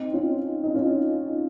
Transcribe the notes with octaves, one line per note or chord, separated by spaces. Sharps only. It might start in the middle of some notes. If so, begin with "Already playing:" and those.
Already playing: C4 D#4
C#4 F4
D#4
C#4 F4